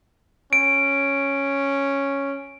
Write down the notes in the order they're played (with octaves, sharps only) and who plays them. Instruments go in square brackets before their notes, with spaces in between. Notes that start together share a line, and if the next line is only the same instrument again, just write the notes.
[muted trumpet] C#4 [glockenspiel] D7